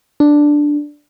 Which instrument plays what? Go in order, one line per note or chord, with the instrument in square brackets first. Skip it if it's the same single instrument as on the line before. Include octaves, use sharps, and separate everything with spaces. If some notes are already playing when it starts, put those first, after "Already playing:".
[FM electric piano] D4